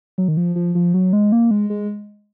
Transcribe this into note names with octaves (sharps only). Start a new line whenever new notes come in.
F#3
D#3
F3
F3
F3
F#3
G#3
A#3
G#3
G#3